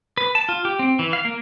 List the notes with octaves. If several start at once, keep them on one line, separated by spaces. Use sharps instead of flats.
B4
A5
F4
G4
C4
E3
F5
A#3